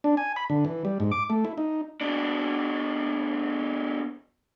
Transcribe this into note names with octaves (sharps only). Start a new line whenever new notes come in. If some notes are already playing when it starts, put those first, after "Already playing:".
D4
G#5
B5
D3
E3
G3
G#2
D6
A3
E4
D#4
B2 D4